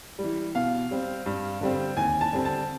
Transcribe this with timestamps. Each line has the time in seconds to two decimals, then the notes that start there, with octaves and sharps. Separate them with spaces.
0.19 G3
0.24 E3
0.55 B2 F5
0.91 G3 C4
1.26 G2
1.61 D3 G3 C4
1.97 D#2 G#5
2.21 A5
2.33 D3 G3 C4
2.45 A5